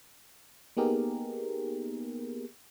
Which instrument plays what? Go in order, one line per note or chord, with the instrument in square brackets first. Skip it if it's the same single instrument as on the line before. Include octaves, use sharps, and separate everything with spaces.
[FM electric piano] A#3 B3 D#4 G4 G#4 A#4